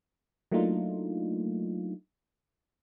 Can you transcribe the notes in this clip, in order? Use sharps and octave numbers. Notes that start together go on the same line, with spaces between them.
F#3 A3 A#3 D4 D#4 F4